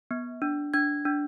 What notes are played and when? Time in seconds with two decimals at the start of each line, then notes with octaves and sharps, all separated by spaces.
0.11 B3
0.42 D4
0.74 D4 G#6
1.05 D4